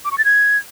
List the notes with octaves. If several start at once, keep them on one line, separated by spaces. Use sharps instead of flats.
D6
C#6
A6
G#6